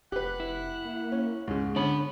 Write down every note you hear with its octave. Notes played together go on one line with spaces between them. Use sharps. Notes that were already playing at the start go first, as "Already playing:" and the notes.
F1 G4 B4 F#5
E4
A#3
C#4
C#2 G#2 C#3
D3 B3 C#4 D4 B5